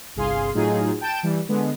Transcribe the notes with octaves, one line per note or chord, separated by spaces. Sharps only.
G1 C2 G#4 F5 C6
A2 F#3 D#4 F4 G#4
G5 A5 G6 D7 E7
E3 G3
D3 G#3 B3